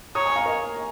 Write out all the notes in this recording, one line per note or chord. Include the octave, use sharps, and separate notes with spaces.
C#5 A#5 D#6
G#5 C#6
F5 A#5
A#4 D#5